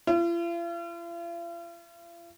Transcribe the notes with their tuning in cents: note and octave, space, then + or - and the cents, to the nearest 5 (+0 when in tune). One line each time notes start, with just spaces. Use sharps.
F4 -45